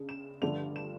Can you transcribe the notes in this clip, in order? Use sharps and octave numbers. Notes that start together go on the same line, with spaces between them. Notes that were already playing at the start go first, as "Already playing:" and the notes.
Already playing: C#3 D4
E7
G2 D3 F3 A3 D4 F7
E7